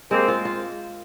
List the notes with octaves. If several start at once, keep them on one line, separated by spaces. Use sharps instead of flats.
G#3 A#3 C4
F4
F4